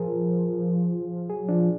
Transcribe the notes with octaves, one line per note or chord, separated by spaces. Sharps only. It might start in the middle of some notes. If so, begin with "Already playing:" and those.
Already playing: F3 G#4 A#4
F#3 G#4
F3 D4